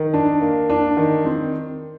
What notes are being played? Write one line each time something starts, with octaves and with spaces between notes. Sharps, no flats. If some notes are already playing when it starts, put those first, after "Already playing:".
Already playing: D#3
D4
A#3
D4
D#3
C4